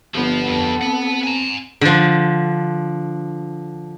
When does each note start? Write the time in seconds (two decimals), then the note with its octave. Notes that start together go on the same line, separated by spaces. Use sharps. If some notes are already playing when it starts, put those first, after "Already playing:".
0.15 G1 F3 B3
0.48 F2 B3 A4
0.82 C4 F#5 B5
1.24 G#5 A#5
1.81 D3 F3